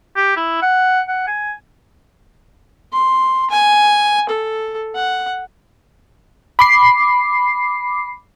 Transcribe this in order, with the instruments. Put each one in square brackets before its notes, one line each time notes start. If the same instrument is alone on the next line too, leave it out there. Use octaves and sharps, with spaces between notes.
[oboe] G4
E4
F#5
F#5
G#5
[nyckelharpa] C6
G#5
A4
F#5
[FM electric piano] B5 D6 C7